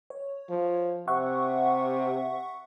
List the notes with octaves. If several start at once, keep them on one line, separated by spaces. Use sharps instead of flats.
C#5
F3
C3 E5 F#5 C#6